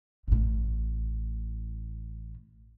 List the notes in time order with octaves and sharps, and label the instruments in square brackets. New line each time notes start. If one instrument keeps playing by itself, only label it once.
[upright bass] A1 A2